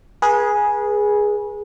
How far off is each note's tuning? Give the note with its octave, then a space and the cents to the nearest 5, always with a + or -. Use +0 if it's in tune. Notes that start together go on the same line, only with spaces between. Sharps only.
G#4 +0 B4 -35